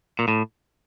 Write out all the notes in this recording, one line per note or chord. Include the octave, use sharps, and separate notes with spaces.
A#2
A2